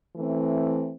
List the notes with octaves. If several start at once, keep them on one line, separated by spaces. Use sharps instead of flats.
E3 A3 C4